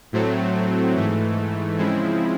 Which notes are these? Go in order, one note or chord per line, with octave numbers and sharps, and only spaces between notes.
A2 F#3 A3 C4
G#2 E3 A3
C#3 F3 G#3 C4 E4